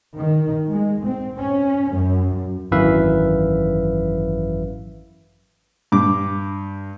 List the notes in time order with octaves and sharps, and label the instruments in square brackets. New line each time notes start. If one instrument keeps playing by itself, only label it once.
[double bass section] D#3
G#3
C4
C#4
F#2
[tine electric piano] G#1 F#2 E3 B4 E5 F5
[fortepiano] G2 D6